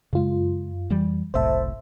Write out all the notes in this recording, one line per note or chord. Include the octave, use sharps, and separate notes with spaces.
F#2 C#3 G#3 F4
F2 E3 G3
F#1 C2 A2 C5 E5 A5